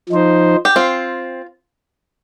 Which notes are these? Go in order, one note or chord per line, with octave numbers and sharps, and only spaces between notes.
F3 D#4 C5
G4
C4 F4